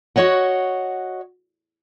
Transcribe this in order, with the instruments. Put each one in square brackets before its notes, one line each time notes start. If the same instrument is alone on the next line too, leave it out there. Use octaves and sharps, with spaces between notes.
[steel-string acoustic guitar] F#4 G#4 C#5 D#5 F#5